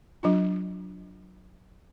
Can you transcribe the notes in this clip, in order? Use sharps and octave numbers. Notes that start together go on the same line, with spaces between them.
F#3 D4 F4